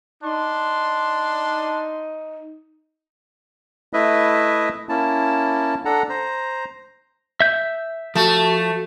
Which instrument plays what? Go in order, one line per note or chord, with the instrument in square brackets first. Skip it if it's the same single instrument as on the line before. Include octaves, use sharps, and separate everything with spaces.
[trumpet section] D4 C6 [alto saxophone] D#4
[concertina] A3 E4 B4 D#5 E5
A#3 C#4 E4 A5
D4 A4 F#5 A#5
C5 A#5
[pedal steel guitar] E5 G6
[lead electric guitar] F3 A5 [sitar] A3 [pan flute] F#4